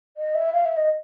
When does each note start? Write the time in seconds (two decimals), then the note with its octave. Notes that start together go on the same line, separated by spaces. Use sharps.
0.17 D#5
0.35 E5
0.53 F5
0.65 E5
0.77 D#5